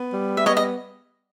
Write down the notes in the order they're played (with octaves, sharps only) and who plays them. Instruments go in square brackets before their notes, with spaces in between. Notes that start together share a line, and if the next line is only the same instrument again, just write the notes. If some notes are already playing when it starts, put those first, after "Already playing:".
Already playing: [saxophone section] B3
G3
[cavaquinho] E5
[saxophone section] B3 [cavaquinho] C#5 D#5
[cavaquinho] D#5